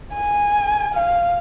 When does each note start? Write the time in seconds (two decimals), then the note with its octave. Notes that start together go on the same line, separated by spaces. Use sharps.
0.15 G#5
0.94 F5